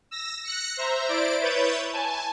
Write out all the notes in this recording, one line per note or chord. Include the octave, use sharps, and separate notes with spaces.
E6 A#6
F#6 A#6 C#7
C5 E5 A#5
E4 C5 D5 D7
E4 B4 C#5 G6 A6
G#5 A5